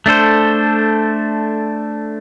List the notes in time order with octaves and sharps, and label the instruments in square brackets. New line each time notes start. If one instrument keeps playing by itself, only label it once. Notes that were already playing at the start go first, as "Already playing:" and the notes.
[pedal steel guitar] A3 D4 A4 C5